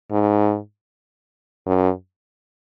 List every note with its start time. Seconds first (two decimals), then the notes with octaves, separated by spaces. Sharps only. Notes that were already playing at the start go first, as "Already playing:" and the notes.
0.11 G#2
1.66 F#2